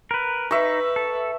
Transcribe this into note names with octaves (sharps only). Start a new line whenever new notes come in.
A#4 B4
D#4 B4 E5 C#6
A4